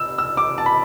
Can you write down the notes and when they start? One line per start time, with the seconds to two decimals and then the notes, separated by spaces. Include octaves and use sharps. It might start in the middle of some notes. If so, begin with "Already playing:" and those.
Already playing: E6
0.18 E6
0.37 D6
0.58 A5
0.66 B5